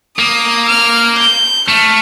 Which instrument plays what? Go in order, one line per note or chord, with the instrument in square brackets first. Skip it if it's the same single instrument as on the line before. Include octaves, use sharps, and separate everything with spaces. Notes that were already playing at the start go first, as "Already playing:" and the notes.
[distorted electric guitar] A#3 [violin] D#6
[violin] F6
G6
[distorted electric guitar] A3 [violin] F6